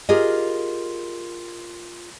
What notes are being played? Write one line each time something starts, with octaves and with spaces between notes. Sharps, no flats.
F4 G4 G#4 A#4 D#5